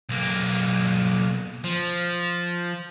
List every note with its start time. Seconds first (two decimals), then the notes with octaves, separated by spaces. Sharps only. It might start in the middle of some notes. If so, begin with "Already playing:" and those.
0.09 B1 A#3
1.64 F3